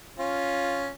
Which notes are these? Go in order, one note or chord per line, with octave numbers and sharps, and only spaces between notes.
C#4 F4